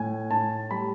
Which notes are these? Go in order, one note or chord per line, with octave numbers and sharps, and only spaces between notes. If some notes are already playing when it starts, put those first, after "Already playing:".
Already playing: A2 G#5
A2 A5
G3 B5